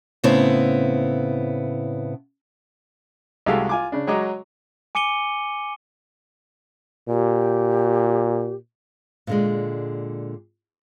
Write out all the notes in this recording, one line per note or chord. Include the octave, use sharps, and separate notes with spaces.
A2 C#3 B3 C4 E4
C2 G#3 F#4 G4 A4 F5
F4 G#5 D6
C#3 D4
F#3 G#3 C#5 D#5 A#5 D6
G#5 D6 C#7 D#7 G7
A#2 G4
A#2 D3 G#3